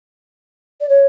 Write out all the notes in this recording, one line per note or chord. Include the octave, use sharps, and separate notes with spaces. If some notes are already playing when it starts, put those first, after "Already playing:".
D5
C#5